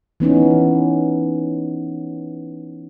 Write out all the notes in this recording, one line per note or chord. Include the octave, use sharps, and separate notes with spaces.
E3 B3 C#4 D#4